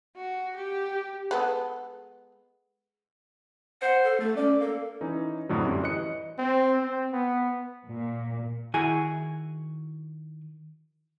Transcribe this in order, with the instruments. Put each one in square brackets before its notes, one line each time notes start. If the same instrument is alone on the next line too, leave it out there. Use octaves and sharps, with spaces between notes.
[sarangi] F#4
G4
[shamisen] G#3 B3 A4
[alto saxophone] C5 [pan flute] F#5
[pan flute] A4
[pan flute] A3 [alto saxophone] A4
[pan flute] C#4 [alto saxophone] D5
[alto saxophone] A#3 [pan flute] A4
[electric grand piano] E3 C#4 D#4
F2 A2 D3 F#3
F#2 G3
E3 D#5 F#6 C#7
[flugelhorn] C4
C4
B3
[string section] A#2
[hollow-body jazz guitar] D#3 E4 F#4 G#4 G#5